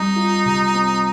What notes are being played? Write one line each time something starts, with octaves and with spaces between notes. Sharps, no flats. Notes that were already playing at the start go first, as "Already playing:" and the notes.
Already playing: G3 C4 D#4
F4
C3
C4